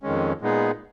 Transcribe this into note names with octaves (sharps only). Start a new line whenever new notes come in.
F2 D#3 G#3 C#4
A#2 G#3 B3 D#4 G#4